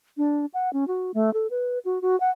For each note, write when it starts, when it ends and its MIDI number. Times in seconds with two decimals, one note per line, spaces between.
0.17 0.46 62
0.54 0.72 78
0.73 0.87 61
0.88 1.11 66
1.14 1.33 57
1.33 1.47 69
1.50 1.79 71
1.85 2.01 66
2.02 2.18 66
2.20 2.30 78